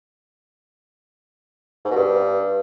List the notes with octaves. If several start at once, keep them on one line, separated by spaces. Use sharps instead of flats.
G#2
B2
G2